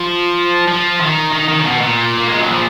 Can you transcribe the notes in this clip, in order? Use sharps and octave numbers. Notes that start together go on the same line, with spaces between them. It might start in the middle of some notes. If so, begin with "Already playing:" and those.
Already playing: F3
F3
D#3
D#3
D#3
C#3
B2
A#2
A#3
G#3
F#3
F3